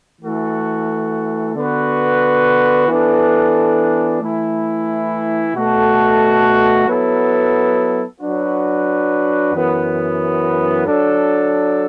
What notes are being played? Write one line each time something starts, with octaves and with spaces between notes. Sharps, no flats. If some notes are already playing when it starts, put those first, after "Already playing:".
E3 A3 F#4 A4
D3 B3 F#4 B4
E3 B3 D4 A4
E3 A3 E4
B2 A3 F#4 A4
F#3 B3 E4 A4
F#3 D4 F#4 B4
F#2 E3 B3
F#3 D4 A4